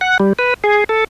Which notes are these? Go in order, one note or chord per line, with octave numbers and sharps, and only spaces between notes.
F#5
G3
B4
G#4
A4